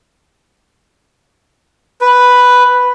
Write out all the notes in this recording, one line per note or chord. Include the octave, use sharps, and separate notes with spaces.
B4